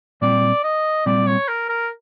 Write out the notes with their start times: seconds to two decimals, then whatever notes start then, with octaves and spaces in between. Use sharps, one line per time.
0.22 A#2 G3 C4 D5
0.64 D#5
1.06 A#2 G3 C4 D5
1.27 C#5
1.48 A#4
1.69 A#4